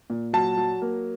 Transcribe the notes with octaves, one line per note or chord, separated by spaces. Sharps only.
A#2
F#3 A5
F#3
A#3